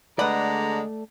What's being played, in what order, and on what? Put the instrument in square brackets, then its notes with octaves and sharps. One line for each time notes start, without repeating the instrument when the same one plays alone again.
[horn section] D3 G#3 A#5 [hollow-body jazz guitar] A3 D5 [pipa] B4 F#5